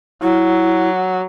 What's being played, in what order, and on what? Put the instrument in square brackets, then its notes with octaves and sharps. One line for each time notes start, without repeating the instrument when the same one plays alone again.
[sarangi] F#3 [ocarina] E4